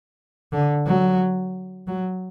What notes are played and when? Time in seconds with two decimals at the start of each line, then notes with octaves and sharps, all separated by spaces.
0.52 D3
0.87 F#3
1.87 F#3